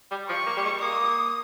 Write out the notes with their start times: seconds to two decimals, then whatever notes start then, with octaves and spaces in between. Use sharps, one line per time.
0.11 G3
0.29 F3 C#6
0.46 A#3
0.57 G3
0.64 G#3
0.81 A#3 D#6